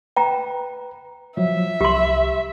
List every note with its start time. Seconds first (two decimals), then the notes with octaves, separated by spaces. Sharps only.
0.16 B4 G5 A#5
1.37 F3 F#3 E5
1.81 C2 G4 C6